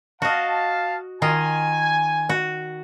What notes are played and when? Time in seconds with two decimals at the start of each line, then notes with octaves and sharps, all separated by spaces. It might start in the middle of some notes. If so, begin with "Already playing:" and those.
0.22 F#4 D#5 F5 A5
1.22 D#3 F4 D#5 G#5
2.29 F#4